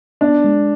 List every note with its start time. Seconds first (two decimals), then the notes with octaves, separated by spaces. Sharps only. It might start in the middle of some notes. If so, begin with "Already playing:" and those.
0.21 B3 D4
0.44 G#3